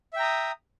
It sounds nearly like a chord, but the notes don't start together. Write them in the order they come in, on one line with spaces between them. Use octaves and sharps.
E5 G5 A#5 D#6